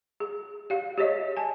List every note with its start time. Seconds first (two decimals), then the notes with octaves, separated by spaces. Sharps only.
0.20 G#4
0.70 G4 F5
0.97 G4 G#4 C#5 D#5 E5
1.37 G#5 A5